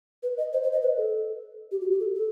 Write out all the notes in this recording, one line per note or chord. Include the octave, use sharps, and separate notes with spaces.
B4
D#5
C5
C5
D#5
B4
A4
G4
F#4
G4
A4
A4